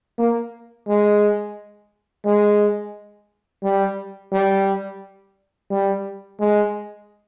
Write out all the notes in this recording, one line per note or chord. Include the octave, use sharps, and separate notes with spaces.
A#3
G#3
G#3
G3
G3
G3
G#3